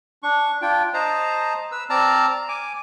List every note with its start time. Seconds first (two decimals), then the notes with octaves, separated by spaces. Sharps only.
0.23 D4 C#6
0.62 D4 F4 G5
0.94 C5 D#5 A5 A#5
1.72 B4 E6
1.90 C4 D5 A5 A#5 F6
2.49 G#5 D6